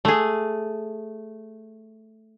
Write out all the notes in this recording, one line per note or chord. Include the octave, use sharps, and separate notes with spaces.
A3 G#4